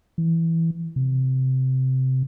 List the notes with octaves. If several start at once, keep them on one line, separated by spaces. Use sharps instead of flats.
E3
C3